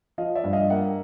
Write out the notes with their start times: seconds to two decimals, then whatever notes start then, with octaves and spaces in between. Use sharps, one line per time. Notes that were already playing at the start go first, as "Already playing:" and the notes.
0.18 F3 D#5 F5
0.35 D5 E5
0.44 G2
0.53 D#5 F5
0.70 A#3 E5 F#5